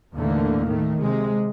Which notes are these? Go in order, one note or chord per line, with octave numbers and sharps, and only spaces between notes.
D#2 A2 D3 E3 A3 A#3
A2 D#3 A3
C3 G#3